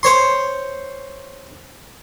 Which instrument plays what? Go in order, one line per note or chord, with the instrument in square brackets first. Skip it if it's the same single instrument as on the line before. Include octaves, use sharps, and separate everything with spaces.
[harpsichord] C5 C#5 C6